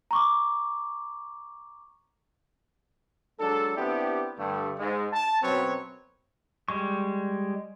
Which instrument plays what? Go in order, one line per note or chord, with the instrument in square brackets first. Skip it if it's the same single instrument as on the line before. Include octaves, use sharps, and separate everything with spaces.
[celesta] A#5 C#6 D6
[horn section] F#3 G#3 D4 A4
B3 C4 D4 E4 G4
G2 D3 A3
G#2 G#3
A5
F#2 B2 F#3 C4 B4 C#5
[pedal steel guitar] G3 G#3 C#6